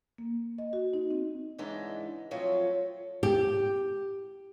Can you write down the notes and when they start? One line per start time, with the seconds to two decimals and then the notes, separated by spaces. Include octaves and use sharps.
0.18 A#3
0.58 D#5
0.73 F#4
0.93 D#4
1.11 C4
1.58 G#2 C#3 E3 G#3 D4 D#4
2.31 F3 F#3 A3 C4 F4 C#5
3.23 G4